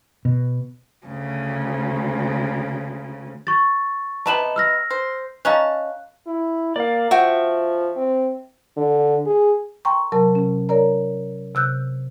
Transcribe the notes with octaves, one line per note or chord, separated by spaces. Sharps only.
B2
D2 C#3
C#6 A6
C3 B3 D#4 A5 E7 F#7
E6 F6 A#6
C5
C#4 D#4 F5 A5 F#6
E4
A#3 D5 F5
F3 F#4 E5 G5
C4
D3
G#4
G5 A#5 C6 C#6
C3 F#3 A#4 A5
C3 C#4
A#4 C#5 D5 A#5
C3 E6 F#6 G6